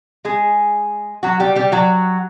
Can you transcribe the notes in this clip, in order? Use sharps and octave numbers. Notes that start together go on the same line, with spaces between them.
G#3 G#4
F#3 F#4
G3 G4
G3 G4
F#3 F#4